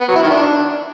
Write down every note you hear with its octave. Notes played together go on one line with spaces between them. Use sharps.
B3
F#3
E4
D#3
D4